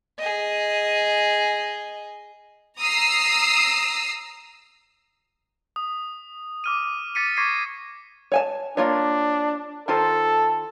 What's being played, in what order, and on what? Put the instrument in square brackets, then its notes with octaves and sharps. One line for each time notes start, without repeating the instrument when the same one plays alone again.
[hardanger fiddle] G#4 D#5
[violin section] A#5 D#6 E6 C7
[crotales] D#6
D6 F6 D#7
D6 A6 B6 C#7 D#7
C#6 D6 G#6 A#6 C7 D#7
[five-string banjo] C#5 G#5 A5
[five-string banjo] A#3 F4 C#5 [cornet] D4
[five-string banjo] D#3 F4 C5 [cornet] A4